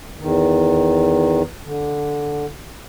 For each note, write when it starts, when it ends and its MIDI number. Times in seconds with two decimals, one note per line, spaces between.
0.19 1.42 40
0.19 1.42 51
1.65 2.45 50